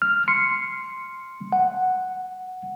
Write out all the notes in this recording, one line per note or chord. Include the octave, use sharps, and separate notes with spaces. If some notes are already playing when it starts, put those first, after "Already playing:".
F6
C6 C7 C#7
F#5